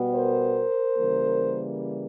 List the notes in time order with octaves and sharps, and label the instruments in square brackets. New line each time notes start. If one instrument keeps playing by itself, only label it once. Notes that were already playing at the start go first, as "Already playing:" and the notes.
Already playing: [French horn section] B2 G3 B3
A#4 C5
C#3 E3 G3 A#3